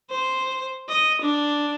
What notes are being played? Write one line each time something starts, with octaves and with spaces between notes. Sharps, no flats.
C5
D#5
D4